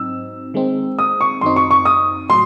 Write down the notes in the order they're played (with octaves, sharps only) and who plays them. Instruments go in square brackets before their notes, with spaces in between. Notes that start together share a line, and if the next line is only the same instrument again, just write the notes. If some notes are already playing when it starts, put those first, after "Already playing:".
Already playing: [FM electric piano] G#2 F#3 C4 D#4 [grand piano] E6
[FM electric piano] D#3 G#3 C4 D#4
[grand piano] D#6
C#6
[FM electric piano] F#2 D#3 F#3 C4 D#4 [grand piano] C6
[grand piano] C#6
C#6
D#6
[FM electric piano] A2 F#3 [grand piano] C6